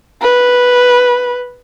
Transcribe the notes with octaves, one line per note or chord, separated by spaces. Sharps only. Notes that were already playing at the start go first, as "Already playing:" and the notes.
B4